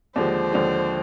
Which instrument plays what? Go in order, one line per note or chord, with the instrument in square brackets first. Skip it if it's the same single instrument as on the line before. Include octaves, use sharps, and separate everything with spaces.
[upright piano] D#2 D3 F3 G#3 [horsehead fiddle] C5
[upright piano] D#2 D3 F3 G#3